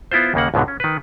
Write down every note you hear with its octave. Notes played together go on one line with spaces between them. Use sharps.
B3 E4 F4 C5
D#2 C#3 A#3 F#5
C#2 G#2 B2 D3
C#4
D#3 B4